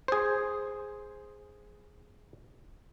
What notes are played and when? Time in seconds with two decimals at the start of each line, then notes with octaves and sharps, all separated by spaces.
0.08 G#4 C5